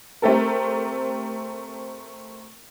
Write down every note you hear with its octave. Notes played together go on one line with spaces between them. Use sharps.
A3 C4 G4 A4 A#4